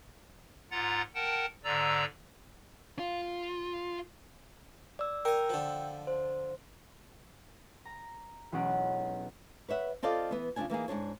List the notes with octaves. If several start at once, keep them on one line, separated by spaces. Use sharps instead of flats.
G#2 F4 F#5 A#5 A6
A#4 F#5 G5 A5
G#2 D3 D5 A#5 E6
F4
D5 E6
A#4 G5 G#5 E6
D3 F3
C5
A#5
E1 B1 C#4 F#5 D7
B4 C#5 E5 F#5
C4 F4 A4 D5 D#5 F5
E3 B3
C#3 F3 G#3 C4 D4 G#5
E3 A#3 D#4 G#4
G#2 C3 D4 C#5